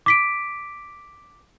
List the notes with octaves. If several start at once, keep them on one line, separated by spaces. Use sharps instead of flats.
D6 B6 D7